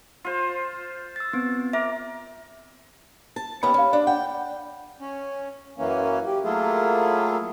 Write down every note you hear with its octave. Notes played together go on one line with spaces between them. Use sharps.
F4 C5
E6 A6
B3 C4
A#4 E5 D6
A5
D#2 B3 C#4 B5
C#4 F5 B5
D4
F#5 G5
C#4
F#2 E3 A#3 C#4
G4
F#3 A3 A#3 E4 F4 G#4